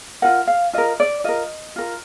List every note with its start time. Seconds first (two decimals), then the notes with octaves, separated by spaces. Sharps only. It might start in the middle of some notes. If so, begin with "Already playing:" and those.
0.22 F4 A#4 F#5
0.47 F5
0.73 F4 A#4 D#5
1.00 D5
1.24 F4 A#4 D#5
1.76 F4 A#4